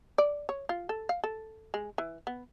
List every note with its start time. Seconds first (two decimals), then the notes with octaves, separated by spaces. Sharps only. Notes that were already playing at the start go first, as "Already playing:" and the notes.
0.18 D5
0.49 C#5
0.69 F4
0.89 A4
1.09 F5
1.24 A4
1.74 G#3
1.98 E3
2.27 B3